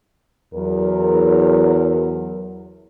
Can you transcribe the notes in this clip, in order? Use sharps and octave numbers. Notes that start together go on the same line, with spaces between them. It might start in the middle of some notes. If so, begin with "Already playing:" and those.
E2 F#3 A#4